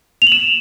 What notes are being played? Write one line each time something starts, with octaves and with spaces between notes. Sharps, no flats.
F7
F#7
E7